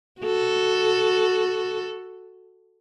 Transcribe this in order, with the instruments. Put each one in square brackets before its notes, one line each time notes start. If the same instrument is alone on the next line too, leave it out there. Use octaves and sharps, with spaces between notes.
[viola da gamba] F#4 A4